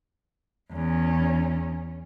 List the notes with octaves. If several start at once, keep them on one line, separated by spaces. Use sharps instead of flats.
E2 C#4